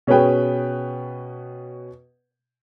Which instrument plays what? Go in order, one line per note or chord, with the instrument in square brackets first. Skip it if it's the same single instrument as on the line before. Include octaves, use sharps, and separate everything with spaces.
[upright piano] B2 C#4 G#4 B4 G5